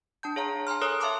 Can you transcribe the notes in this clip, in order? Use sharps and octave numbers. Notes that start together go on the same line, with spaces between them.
D4 A5 G6
G#4 C#5 F5 A#5
G#5 A#5 C6 F6
A4 A#4 C#5 D#6 F#6
E5 F5 A5 C6 D6